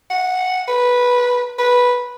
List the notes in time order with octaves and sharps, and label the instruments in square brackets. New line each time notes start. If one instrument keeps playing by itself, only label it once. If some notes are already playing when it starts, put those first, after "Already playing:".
[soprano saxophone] F#5
B4
B4